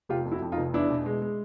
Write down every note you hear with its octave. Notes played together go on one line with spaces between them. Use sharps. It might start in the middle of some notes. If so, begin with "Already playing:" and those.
F1 F4 G4
F2
E4 F#4
F2
D#4 F4
F1
E2 D4 E4
B2
G#3
G#3